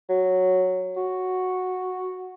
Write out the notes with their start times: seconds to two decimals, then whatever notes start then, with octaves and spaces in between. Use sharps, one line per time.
0.09 F#3
0.97 F#4